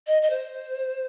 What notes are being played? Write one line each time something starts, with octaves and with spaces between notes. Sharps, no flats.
D#5
D#5
C5